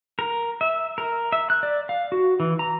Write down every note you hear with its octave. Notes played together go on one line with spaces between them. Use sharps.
A#4
E5
A#4
E5
F#6
D5
F5
F#4
E3
A#5